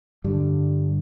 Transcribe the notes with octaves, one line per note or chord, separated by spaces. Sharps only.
G2 D3 G3